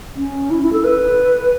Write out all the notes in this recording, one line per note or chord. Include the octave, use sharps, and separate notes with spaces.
C#4
E4
E4
A4
B4